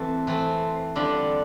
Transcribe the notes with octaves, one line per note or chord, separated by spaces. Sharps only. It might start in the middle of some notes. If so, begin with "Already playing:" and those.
Already playing: E3 A3 C4
E3 A3 C4
D3 G3 D4 F4